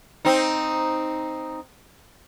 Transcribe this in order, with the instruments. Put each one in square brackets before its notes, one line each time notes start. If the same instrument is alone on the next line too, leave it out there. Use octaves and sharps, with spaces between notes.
[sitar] C4 D#4